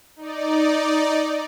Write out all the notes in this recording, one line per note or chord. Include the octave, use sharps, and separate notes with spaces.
D#4 D5